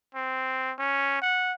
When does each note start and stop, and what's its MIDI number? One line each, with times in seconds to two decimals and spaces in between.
0.15 0.72 60
0.79 1.20 61
1.21 1.53 78